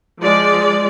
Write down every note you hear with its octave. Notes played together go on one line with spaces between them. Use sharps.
F3 G#3 D5